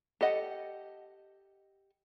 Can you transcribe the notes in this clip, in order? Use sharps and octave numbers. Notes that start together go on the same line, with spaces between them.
G4 A4 D#5 F#5